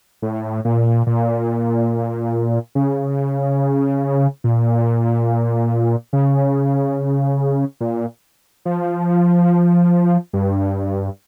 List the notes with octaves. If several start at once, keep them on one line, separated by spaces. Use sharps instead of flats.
A2
A#2
A#2
C#3
A#2
C#3
A#2
F3
G2